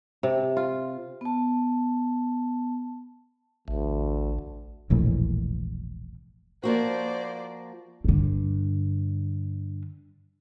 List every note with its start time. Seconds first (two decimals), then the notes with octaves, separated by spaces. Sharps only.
0.23 C3
0.57 F4
1.21 B3 A5
3.68 A1 D2
4.90 E1 A#1 A2
6.63 F3 A#3 F#4 C5 D5
8.04 G2 D3